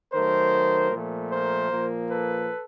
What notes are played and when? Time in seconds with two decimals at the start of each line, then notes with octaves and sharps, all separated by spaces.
0.13 D#3 F#3 A3 A#4 C5
0.92 A#2 F3 A3
1.32 A#4 C5
1.71 A#2 F3 A#3
2.10 A4 B4